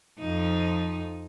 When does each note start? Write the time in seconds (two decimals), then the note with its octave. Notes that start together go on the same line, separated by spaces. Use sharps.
0.19 F2 F3 D#4